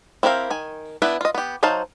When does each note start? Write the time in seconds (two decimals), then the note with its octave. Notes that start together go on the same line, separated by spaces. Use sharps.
0.23 C4 E4 G4 A#4 F5
0.50 D#3 G#5
1.02 B3 D4 E4 B4
1.21 F4 D#5
1.35 B3 G4
1.63 F#3 D#4 C5 F5 A5